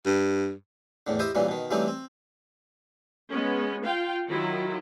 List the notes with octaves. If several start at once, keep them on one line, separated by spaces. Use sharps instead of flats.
G2
E2 A2 D3
E4 G4 C5 D#5 E5 D#6
G2 A#2 E3 F#3 G3
B2 D#3
E3 F#3 G3 A3 C4 D#4
C4
G#3 B3 C#4
F4 F5 G5
D#3 F#3 E4 F4